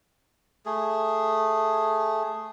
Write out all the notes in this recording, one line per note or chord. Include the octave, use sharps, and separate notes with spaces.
A3 G#4